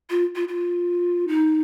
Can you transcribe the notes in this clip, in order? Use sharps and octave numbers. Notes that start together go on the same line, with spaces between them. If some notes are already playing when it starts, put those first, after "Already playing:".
F4
F4
F4
D#4